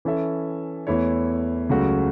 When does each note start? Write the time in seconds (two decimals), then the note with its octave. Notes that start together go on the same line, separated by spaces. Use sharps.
0.05 E3 C#4 A4 E5
0.87 E2 E3 A3 E4 C#5
1.69 C#2 C#3 F#3 A3 F#4